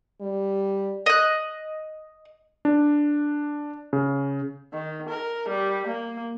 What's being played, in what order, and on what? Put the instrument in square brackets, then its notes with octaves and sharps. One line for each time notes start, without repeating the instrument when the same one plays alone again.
[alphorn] G3
[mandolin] D#5 F#6
[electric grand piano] D4
C#3
[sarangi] D#3
A#4
G3
A#3